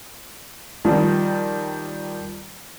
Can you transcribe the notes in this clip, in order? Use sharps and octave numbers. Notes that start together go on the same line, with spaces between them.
D#3 F3 G3